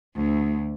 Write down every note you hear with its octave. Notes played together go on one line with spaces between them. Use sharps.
D2